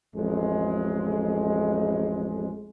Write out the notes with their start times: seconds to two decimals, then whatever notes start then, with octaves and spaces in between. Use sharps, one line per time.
0.16 A1 F2 G#3